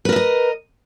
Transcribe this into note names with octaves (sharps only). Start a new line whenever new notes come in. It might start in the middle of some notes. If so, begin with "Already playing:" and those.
A#4 B4 D#5 E5